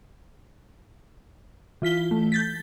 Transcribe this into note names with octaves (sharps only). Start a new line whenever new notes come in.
E3 F4 B6 G7
A3
G6 A6 B6